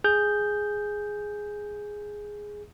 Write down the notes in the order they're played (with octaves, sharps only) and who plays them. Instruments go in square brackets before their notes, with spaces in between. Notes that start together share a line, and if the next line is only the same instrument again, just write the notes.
[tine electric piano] G#4 G6